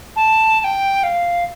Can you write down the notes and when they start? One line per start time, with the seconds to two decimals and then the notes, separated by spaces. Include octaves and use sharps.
0.16 A5
0.60 A5
0.64 G5
1.03 F5